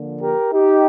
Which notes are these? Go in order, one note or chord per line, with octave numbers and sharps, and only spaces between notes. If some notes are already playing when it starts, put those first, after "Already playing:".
Already playing: D3 F3 A#3
G4 A#4
D#4 G4